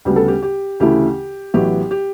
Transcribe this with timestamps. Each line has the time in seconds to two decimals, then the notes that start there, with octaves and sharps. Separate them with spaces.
0.05 D2 C#3 G3 B3 G4
0.16 A4
0.28 G4
0.43 G4
0.80 D2 C#3 E3 A3 E4 G4
1.54 A1 A2 F#3 B3 E4 G4
1.91 G4